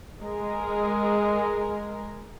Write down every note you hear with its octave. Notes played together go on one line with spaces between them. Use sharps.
G#3 A#4